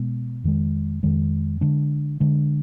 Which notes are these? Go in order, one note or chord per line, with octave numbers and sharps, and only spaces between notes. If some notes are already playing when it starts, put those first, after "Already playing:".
Already playing: B2 G#3 B3
F2 D#3 G#3
F2 D#3 G#3
D3 G#3 D4
D3 G#3 D4